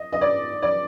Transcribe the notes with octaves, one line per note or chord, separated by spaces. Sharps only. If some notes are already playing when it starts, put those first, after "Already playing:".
Already playing: D#5
D#5
D5
D5